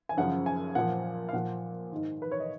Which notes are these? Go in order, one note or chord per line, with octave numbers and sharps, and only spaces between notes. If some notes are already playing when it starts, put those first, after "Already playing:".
G#5
F#2 C#3 F3 F#5
G#5
A#2 F3 F#5
F5
A#2 F3 F#5
G#2 D#3
B4
C#5
D#5